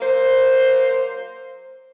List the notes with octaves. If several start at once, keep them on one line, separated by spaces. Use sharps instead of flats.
F#3 A#3 C5